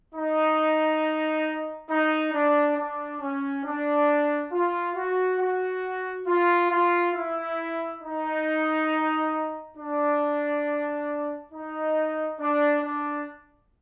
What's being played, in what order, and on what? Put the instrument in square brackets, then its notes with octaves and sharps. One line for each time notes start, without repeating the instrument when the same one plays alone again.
[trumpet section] D#4
D#4
D4
D4
C#4
D4
F4
F#4
F#4
F4
F4
E4
D#4
D4
D#4
D4
D4